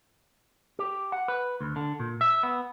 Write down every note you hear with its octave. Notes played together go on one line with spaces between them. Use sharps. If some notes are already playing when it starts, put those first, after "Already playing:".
G4
F#5
B4
D2
D3
A#2
E5
B3